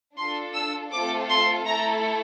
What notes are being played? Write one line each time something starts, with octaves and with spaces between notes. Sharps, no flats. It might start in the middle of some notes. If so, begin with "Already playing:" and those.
D4 F4 A4 C6
E6
A3 C4 F4 A4 D6
C6
A3 E4 A4 A#5